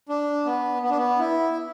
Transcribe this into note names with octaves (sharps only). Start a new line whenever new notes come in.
D4
B3
B3
D4
B3
E4